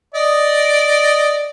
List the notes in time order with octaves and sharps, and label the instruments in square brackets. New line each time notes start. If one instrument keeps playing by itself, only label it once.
[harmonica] D5 D#5